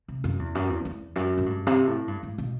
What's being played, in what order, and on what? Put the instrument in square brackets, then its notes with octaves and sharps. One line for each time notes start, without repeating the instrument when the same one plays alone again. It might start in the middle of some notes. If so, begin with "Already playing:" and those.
[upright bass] C3
F#2
E2
F#2
E2
E2
F#2
A2
G2
C3
A2
G2
A2
B2